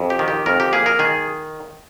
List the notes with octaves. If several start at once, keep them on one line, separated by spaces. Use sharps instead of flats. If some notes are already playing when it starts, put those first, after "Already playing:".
Already playing: F2
G4
D#3
G4
F2 A#4
G4
A#3 G#4
A#4
D#3 G#4